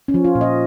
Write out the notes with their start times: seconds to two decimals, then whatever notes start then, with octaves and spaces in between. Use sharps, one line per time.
0.08 C#4
0.14 F3
0.24 F4
0.35 A#2
0.41 D#5